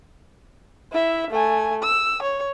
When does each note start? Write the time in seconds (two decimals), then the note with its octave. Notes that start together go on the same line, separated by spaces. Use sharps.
0.92 E4 E5
1.31 A3 G#5
1.83 E6
2.22 C#5